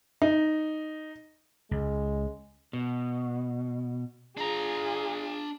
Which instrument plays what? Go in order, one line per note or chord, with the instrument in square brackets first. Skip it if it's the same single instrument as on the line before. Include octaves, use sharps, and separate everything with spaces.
[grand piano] D#4
[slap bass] C#2 [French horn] G#3
[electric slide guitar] B2
[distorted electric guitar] D4 A#5 [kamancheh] F4 G#4